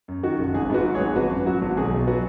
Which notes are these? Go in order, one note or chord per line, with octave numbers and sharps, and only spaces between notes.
F#2
D#3 F#4
F#1
G#1 G#4
G#2 F#4 B4
F#3
G#4 C#5
G#1
G#1 F#4 B4
F#2
F#3 F#4
G#1
B1 G#4
B2
F#3 F#4 B4